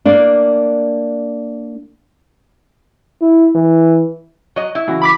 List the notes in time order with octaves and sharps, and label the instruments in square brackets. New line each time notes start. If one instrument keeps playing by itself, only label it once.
[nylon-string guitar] A#3 D4
[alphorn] E4
E3
[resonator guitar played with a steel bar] F#3 D#5
E4
[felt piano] C#3 E3 F#4
[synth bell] B5 D6 B6